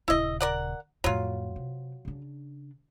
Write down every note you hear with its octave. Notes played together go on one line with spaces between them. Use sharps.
D#1 C#3 E4 D#5
A#4 D5 F#5
F2 A2 F#3 F4
C3
C#3 D4